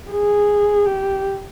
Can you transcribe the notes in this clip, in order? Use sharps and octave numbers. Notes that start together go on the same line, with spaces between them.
G#4
G4